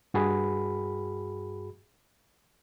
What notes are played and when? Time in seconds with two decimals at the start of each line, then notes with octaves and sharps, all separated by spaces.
0.14 G2 F#4 G#4 B5